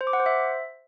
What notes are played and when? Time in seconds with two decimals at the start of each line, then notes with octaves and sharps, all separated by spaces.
0.01 C5
0.07 D6
0.13 F#5
0.20 C5
0.26 E5